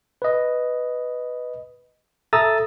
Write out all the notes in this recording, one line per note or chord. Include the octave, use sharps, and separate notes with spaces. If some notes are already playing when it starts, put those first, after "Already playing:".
B4 D#5
A4 E5 A#5 D#6 E6 A6